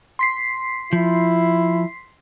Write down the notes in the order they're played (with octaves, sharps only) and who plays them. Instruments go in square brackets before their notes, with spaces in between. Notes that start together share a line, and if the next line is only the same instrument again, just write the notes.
[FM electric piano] C6 B6 C7
[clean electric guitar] F3 [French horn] E4